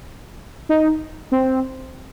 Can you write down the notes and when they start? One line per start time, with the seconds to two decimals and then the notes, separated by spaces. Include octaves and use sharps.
0.69 D#4
1.32 C4